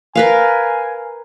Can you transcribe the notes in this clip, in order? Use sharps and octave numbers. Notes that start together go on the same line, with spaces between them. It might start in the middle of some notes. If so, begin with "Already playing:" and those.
A#4 B4 F5 G#5